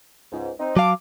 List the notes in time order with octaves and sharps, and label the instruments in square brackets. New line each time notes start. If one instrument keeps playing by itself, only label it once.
[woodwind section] C#2 G#2
C4 D#4
[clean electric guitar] F#3 F5 [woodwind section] A5 D6